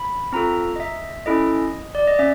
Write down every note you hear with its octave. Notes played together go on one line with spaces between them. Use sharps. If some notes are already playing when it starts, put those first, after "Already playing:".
Already playing: B5
C4 F4 A4 A#5
D#5
E5
C#4 E4 A4 D#5
D5
D#5
C#4 E5